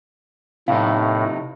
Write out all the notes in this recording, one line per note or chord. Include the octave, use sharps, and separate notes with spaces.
A2 C3 D#4 F5 C6